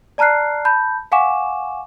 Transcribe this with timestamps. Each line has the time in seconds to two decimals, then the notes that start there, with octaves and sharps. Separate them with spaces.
0.18 D5 A5 A#5 F6 F#6 C7
0.65 A5 B5 G6
1.12 F5 F#5 G#5 C#6 D6 E7